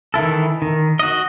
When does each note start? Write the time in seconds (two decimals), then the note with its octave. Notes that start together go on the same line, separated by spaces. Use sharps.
0.14 D#3 E3 E4 A4
0.62 D#3
0.99 F#4 D#5